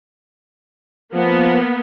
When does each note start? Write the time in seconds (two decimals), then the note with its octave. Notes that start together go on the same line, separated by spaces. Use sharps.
1.14 F3 A#3 B3